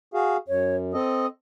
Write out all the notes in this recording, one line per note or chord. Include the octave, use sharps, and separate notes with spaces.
F#4 G#4 F5
F#2 C#5
C4 A4 D#5 D#6